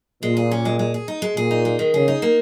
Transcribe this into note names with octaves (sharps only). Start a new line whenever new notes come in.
A#2 G#3
G#4
C#4
G#3
G#3
G#4
D#4
G#3
A#2 G#4
D#4
G#3
D#3
C#3 G#4
D#4
A#3